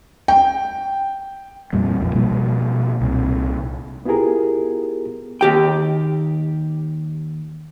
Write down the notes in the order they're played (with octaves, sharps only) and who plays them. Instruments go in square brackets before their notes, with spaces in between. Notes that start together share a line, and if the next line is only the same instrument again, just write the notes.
[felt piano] G5
[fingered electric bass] A1 F2 A#2 G3
A#1 F2 A#2
B2 F3 G3 A#3
C2 A#2
[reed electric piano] B3 E4 F4 G4 G#4 A#4
[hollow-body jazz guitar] D#2 G4 G5